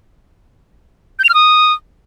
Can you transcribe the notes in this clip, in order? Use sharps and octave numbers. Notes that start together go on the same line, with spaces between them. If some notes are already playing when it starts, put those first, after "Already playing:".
G6
F7
F6
D#6